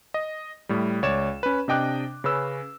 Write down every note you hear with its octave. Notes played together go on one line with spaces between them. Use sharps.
D#5
A2 G3
C#2 C#5 D5 E7
C#4 B4
C3 D4 D#5 G5 D6 F#6
C#3 C#4 B4 E6